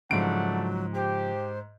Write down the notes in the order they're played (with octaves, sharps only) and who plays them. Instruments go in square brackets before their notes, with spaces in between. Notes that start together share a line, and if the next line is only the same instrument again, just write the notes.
[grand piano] G#2 D7 [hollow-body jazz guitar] C#3 F3 [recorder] F#3 [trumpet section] A3 D4 F#5
[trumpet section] G4 [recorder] C5